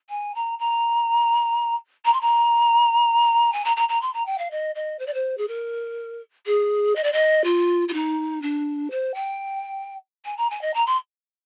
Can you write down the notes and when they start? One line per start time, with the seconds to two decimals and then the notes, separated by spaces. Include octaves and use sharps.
0.09 G#5
0.35 A#5
0.59 A#5
2.05 A#5
2.13 C6
2.21 A#5
3.53 G#5
3.64 A#5
3.76 A#5
3.89 A#5
4.01 C6
4.13 A#5
4.26 G5
4.38 F5
4.51 D#5
4.75 D#5
4.99 C5
5.07 D5
5.14 C5
5.38 G#4
5.48 A#4
6.46 G#4
6.95 D#5
7.03 D5
7.13 D#5
7.44 F4
7.88 F4
7.93 D#4
8.42 D4
8.91 C5
9.14 G5
10.25 G#5
10.37 A#5
10.50 G#5
10.61 D#5
10.74 A#5
10.86 C6